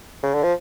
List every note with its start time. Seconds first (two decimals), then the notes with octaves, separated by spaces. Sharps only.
0.23 C#3
0.34 D3
0.43 F3